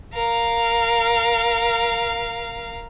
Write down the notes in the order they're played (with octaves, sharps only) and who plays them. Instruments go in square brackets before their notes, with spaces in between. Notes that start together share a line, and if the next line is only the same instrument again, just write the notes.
[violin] A#4 F5